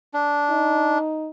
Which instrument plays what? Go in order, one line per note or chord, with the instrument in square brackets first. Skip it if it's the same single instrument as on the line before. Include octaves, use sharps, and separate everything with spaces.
[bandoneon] D4
[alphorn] D#4